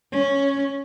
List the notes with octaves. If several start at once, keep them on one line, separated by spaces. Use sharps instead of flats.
C#4